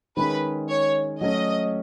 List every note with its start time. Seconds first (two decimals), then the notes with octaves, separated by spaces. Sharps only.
0.17 D#3 G#3 C#4 G#4 B4
0.69 C#5
1.21 F#3 A3 C#4 D#5